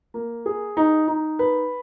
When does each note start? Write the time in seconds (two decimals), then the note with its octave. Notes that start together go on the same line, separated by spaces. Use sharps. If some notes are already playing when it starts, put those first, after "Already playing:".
0.14 A#3
0.46 G#4
0.77 D#4
1.08 D#4
1.39 B4